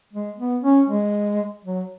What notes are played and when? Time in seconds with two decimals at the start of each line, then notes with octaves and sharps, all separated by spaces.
0.13 G#3
0.39 B3
0.64 C#4
0.89 G#3
1.65 F#3